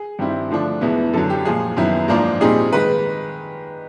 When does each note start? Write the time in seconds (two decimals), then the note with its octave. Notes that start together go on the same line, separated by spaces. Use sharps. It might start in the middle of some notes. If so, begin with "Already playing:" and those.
Already playing: G#4
0.19 G2 D#3 G3 C4 E4
0.50 D3 F3 A3 D4
0.81 E2 B2 G#3 B3 E4
1.13 F#2 D3 F#3 A4
1.30 G4
1.45 A#2 F3 G#3 G#4
1.76 F#2 D#3 F#3 B3 E4
2.08 G#2 F3 A#3 D4
2.41 A#2 G3 C4 D#4 G#4
2.73 D#3 G#3 B4